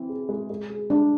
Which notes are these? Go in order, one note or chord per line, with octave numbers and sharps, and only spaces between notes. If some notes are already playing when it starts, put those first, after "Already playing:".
Already playing: E3 C4
G#4
G#3
G#3
G#4
G#3 D4